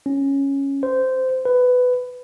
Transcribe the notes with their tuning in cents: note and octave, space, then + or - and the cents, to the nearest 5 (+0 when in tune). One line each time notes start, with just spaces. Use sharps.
C#4 -5
C5 -15
B4 +15